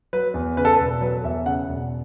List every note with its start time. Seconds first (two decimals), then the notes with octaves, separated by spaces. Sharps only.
0.13 F#3 B4
0.34 E2
0.57 C#3 B4
0.65 A4
0.74 B4
0.79 E1
1.01 F#3 B4
1.24 E2 E5
1.46 C#3 F#5
1.68 E1